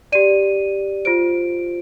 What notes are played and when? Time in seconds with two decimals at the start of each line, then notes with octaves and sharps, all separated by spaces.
0.12 G4 D5 D#7
1.05 F4 C5 D7